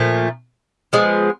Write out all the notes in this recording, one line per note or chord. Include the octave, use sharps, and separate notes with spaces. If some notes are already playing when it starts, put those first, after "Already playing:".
Already playing: A#2 F3 A3
F3 G#3 B3